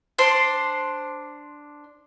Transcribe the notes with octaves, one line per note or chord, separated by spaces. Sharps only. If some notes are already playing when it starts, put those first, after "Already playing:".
D4 C5 C6